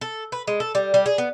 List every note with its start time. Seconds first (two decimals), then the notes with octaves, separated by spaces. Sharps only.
0.01 A4
0.32 B4
0.47 G#3
0.60 A4
0.75 G3
0.94 G3
1.06 G#4
1.18 B3